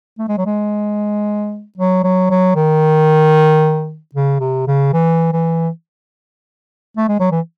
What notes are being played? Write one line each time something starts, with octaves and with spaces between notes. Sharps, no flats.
A3
G#3
F#3
G#3
F#3
F#3
F#3
D#3
C#3
C3
C#3
E3
E3
A3
G#3
F#3
E3